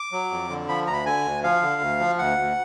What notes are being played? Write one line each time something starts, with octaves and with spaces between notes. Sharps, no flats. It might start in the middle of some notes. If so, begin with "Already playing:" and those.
Already playing: D6
F#3
F2
D3
F3 B5
D2 A#5
B5
D3 G#5
D2
F3 F5
D3
D2
F3
D2 F#5
D2